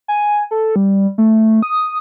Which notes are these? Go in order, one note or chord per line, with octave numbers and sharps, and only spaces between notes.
G#5
A4
G3
A3
D#6